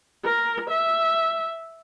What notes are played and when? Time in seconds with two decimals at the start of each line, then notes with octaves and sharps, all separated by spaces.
0.24 A#4
0.70 E5